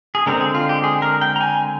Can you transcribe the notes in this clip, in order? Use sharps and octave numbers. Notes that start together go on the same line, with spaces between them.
G#4
D3 G#3 C4 A#4
G#4
F4
G4
G#4
A#4
G5
A#5
G#5